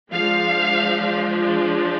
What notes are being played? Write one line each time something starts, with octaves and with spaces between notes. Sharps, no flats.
F3 G#3 D4 F5